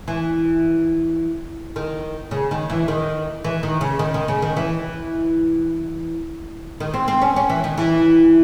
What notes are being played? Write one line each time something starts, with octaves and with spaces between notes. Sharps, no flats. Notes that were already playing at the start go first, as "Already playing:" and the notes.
E3
D#3
C#3
D#3
E3
D#3
E3
D#3
C#3
D#3
D#3
C#3
D#3
E3
D#3
C4
C4
C#4
C#4
E3
D#3
E3